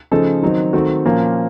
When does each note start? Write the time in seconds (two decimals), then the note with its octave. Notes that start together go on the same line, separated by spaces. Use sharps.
0.11 C#3 F3 A3 D#4 A4
0.42 D#3 F#3 C4 D#4
0.73 D#3 A3 C4 F#4
1.05 A#2 F3 A#3 C#4